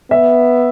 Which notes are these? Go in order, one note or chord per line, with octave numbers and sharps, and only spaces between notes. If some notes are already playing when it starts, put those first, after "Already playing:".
B3 E5